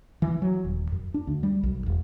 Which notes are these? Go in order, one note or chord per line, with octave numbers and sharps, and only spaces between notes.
E3
F#3
D#1
F#2
D4
D2
G3
B1
E1